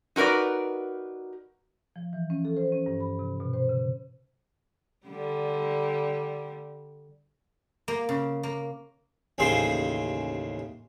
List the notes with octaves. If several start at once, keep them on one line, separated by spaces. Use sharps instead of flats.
D#4 F#4 A#4 B4 D5
F3
E3
C#4
A4
C5
C#4
G2
B5
C3
B2
C5
C#3
D3 G3
A#3
C#3
A#3
A1 D#2 C#3 G#4 C5 C6